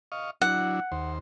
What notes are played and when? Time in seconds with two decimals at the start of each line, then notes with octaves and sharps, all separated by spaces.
0.12 D#5 F5 C#6
0.42 F#3 D4 E4 F#5
0.92 D#2 C5